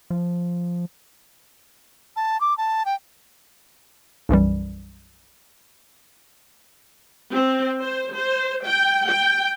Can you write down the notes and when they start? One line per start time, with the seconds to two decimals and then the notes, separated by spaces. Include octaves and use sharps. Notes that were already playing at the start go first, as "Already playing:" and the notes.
0.11 F3
2.16 A5
2.41 D6
2.58 A5
2.86 G5
4.29 B1 F#2 E3 G3
7.32 C4
7.81 C5
8.16 C5
8.64 G5
9.07 G5